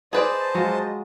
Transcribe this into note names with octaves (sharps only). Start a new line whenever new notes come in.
G#4 B4 C5 D5 D#5 A5
F#3 G#3 F4